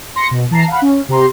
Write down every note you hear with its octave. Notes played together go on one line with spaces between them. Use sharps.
C6 A#6 C#7
B2
E3 A5 A#5 C7
F5 F#5 B5
C#4
C3 G4 A#5 C6